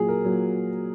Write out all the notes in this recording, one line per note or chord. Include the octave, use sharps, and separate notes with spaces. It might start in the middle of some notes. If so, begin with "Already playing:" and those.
Already playing: A#2 F#3 G#4
A#4
A#2 F#3